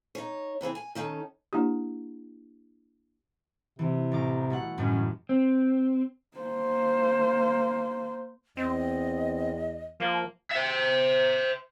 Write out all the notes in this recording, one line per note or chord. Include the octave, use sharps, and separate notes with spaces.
D#4 C#5
C3 E3 C4 G#4
G#5
D#3 C#4 D#4 A4
A#3 D4 E4 G4
C3 E3
A1 A#5 D6
B2 A3 F#5
G1 F#2 A2 C#4
C4
A#3 C5
E2 C4 D#5
F3 A#3
C5 E5